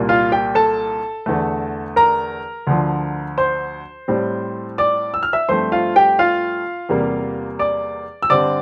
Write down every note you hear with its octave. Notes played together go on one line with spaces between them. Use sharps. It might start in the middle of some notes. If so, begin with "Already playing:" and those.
Already playing: C2 A#2 G3 A#3
F4 F5
G4 G5
A4 A5
E2 D3 A3
A#4 A#5
D2 D3 F3
C5 C6
A2 G3 C4
D5 D6
E6
F6
E5 E6
G2 F3 A3 C4 C5 C6
F4 F5
G4 G5
F4 F5
E2 C3 G3 A#3
D5 D6
E6
G2 D3 G3 C4 D5 D6